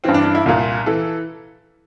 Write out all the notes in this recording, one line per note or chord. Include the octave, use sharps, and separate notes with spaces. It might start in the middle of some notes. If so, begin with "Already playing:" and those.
G2 E3 C4
D4
D4
E4
C2 A#2 F4
E3 A4